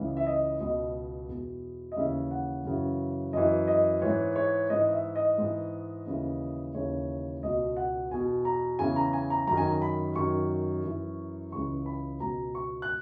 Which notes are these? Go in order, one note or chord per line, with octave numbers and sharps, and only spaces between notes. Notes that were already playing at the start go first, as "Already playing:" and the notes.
Already playing: C#2 C#3 E3
E5
D#5
C#2 B2 D#5
E2 B2
D#5
D#2 C#3 E3 E5
F#5
F#2 C#3 E3
F#2 E3 D#5
D#5
G#2 E3 C#5
C#5
G#2 E3 D#5
E5
D#5
G#2 E3
D#2 C#3 E3
D#2 C#3 E3 C#5
C#2 B2 D#5
F#5
E2 B2 G#5
A#5
E2 C#3 E3 G#5
A#5
G#5
A#5
F#2 D#3 A#5
G#5
A#5
B5
F#2 D#3 C#6
F#2 E3
C#2 C#3 E3 C#6
B5
C#2 B2 A#5
C#6
F#6